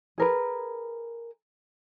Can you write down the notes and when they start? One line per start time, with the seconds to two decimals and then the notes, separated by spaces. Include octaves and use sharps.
0.18 G#4 A#4 B4